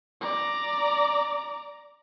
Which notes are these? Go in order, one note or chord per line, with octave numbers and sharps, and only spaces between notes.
D5 A#5